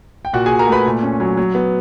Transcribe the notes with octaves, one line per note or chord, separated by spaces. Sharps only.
G5
A#2 F#4 F#5
G#4 G#5
A#2
A#4 A#5
A3 B4 B5
A#2
C#4
F#3
F#3
B3